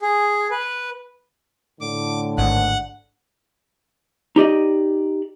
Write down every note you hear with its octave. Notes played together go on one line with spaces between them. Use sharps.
G#4
B4
A2 D3 D6
G#1 F#5 F#6
D#4 G4 D5 D#5